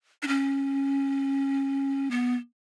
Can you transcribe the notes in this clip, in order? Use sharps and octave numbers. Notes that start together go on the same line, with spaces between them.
D4
C#4
B3